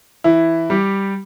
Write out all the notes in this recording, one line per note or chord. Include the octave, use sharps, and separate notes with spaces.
E3 E4
G3 G4